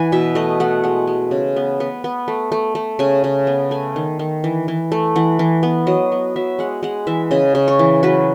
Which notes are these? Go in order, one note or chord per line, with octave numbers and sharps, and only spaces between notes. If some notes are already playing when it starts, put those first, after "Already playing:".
Already playing: E3 F#5 G#5
B2 E5
A3 D#5
A3 F#5
G#3 F#5
G#3
C#3
B3
B3
B3
A3
A3
A3
C#3 G#5
C#3
B3
A3 G#5
D#3
D#3
E3
E3
A3
E3 F#5
E3
B3
F#3 D#5
B3
F#3 E5
G#3 F#5
G#3 F#5
E3 E5
C#3 D#5
C#3
C#5
E3
F#3 B4